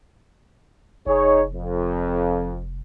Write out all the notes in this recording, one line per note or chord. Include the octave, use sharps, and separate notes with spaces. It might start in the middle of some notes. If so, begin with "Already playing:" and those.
F1 D#4 G#4 C#5
F2